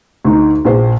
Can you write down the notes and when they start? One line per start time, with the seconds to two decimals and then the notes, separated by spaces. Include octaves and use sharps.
0.25 D2 D#4
0.65 A#1 A#2 C5